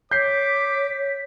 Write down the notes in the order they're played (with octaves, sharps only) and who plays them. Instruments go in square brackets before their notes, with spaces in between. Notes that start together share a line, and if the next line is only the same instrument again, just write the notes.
[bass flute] C#5 [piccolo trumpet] D6 [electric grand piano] G6 C7 [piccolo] B6